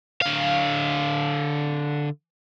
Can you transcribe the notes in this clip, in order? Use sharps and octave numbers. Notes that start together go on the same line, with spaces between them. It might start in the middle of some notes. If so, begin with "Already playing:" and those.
D3 F5